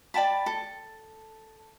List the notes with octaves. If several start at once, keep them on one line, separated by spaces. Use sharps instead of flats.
D5 G5 A5 B5
A4